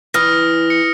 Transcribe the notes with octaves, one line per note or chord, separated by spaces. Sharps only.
E3 D#6 F6 A#6
C#7